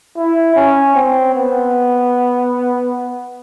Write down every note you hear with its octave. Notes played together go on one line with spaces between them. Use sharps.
E4
C#4
C4
B3